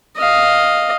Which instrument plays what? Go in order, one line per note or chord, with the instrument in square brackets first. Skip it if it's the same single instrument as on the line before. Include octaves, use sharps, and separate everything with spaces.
[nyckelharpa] D#5 F5